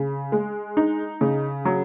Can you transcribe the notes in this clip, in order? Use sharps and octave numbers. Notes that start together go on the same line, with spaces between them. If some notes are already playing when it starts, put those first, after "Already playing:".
Already playing: C#3
G#3
D#4
C#3
F#3